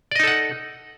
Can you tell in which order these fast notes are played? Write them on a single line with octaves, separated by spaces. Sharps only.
D5 D#5 D#4 A4 F#5